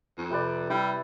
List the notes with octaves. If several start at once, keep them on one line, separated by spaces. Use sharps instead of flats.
F2
C3 B4 D5
G3 E4